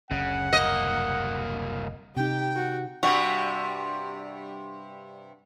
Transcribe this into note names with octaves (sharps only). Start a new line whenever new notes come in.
F#1 D2 C#3 F#5
C2 A#3 D#5
C3 D#4 G4 G5
F#4 F#5
G2 C3 G3 F#4